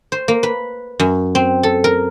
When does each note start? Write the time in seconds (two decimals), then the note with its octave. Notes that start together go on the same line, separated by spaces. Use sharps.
0.12 C5
0.28 A#3
0.43 B4
1.00 F#2
1.35 C4
1.63 A4
1.84 A#4